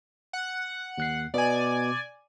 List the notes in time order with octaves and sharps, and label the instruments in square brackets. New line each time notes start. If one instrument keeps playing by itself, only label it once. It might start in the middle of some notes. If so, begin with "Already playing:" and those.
[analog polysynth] F#5
[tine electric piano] D#2 F#6 C7
[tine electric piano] B2 B3 [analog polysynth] D5 G#5